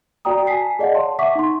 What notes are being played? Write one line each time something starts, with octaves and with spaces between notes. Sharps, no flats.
F#4 D5 G5 A#5 D#6
G#5 A5 B6 C7
G#4 D5 D#5 F5 F#5
C#5 A5 C6
E5 F#5 C#6 D6 B6
D#4 C6